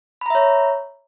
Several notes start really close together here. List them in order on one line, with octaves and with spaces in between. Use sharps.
B5 A#5 E5 C#5